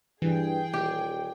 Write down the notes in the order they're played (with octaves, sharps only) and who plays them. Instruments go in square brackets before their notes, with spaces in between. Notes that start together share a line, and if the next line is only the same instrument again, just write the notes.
[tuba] G2 [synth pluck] E3 [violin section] G#4 G5
[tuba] D#1 [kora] G4